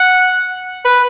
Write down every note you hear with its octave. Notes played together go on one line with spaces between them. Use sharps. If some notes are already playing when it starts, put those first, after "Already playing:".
Already playing: F#5
B4